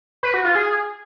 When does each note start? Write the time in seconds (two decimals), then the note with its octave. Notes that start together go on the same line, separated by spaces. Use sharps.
0.23 B4
0.34 F#4
0.45 F4
0.55 G#4